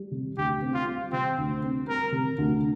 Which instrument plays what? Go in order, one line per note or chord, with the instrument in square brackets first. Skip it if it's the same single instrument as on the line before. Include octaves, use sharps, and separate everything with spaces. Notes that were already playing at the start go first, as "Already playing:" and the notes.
Already playing: [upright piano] G3
C3
[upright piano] D2 [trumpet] G4
[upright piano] C4
[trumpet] F4
[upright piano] G3
[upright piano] C3 [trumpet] C4
[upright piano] D2
C4
[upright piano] G3 [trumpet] A#4
[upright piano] C3
D2